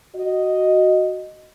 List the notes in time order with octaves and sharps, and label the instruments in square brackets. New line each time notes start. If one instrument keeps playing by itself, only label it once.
[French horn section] F#4 D#5